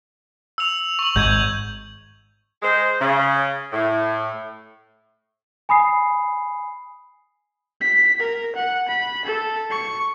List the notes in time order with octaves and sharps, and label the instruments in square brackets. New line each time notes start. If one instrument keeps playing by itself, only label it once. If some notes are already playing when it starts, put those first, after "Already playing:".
[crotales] E6 F7
C#6 F#7
[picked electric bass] G#1 G#2 [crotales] G6 G#6 F#7
[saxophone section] G#3 C5
C#3
A2
[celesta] G#5 B5 D#6 C7
[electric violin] B6
A#4
F#5
B5
A4
C#6